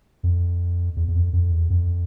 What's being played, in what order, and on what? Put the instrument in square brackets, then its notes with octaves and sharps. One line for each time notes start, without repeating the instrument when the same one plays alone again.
[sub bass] F2
E2
E2
F2
F2
E2
F2